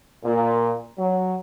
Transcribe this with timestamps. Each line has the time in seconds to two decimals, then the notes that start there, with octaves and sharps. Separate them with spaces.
0.24 A#2
0.98 F#3